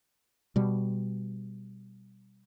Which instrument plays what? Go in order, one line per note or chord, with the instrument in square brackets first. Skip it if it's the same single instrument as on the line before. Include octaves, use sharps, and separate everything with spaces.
[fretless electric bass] B2 G3